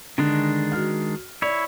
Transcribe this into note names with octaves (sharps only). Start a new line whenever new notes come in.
D3 D#3 G#3 D4
F#4 F6
E4 C#5 D5